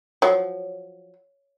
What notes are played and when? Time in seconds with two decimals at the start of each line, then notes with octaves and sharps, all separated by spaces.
0.22 F3 F#3 C#5